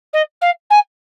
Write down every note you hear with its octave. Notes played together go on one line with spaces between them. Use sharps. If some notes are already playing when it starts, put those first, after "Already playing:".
D#5
F5
G#5